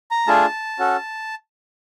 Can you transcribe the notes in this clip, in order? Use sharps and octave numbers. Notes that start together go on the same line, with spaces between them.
A#5
A3 D4 F4 G#4 A5
C#4 F#4 A4